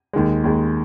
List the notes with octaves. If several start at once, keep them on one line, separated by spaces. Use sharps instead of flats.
D#2 D#3 G#3
D#2 D#3 G#3